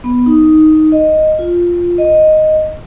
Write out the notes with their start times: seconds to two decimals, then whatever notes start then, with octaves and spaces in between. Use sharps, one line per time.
0.04 B3
0.26 D#4
0.92 D#5
1.39 F4
1.98 D#5